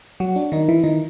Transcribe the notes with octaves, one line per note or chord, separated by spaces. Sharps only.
F#3 F#4
D4
D#3 D#4
E3 E4
D#3 D#4